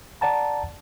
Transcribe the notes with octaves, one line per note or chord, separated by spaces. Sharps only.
D5 F#5 A5 A#5